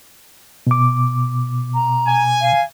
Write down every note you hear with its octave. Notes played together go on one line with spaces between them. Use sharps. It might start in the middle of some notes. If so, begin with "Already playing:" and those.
B2 D6
A#5
G#5
F5